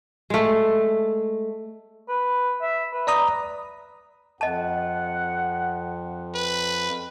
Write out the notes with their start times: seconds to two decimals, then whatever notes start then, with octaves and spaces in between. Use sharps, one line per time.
0.30 G#3 A3
2.09 B4
2.62 E5
2.93 B4
3.07 D5 A#5 D#6
4.41 F2 D#5 F#5 A5
6.35 B4